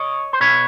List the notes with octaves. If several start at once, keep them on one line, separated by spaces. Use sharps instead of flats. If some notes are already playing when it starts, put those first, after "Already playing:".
Already playing: C#5 D#5
C5
B2 B4 C#5